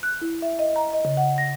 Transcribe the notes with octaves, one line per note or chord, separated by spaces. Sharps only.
F#6
E4
E5
D#5
A#5
D#5
C#3
F#5
A#6